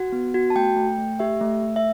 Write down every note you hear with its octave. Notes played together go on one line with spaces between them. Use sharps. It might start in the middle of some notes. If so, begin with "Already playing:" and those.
Already playing: F#4 F#5
B3
F#4
A5
A3 G5
A3
A3
G4 E5
A3
A3
E5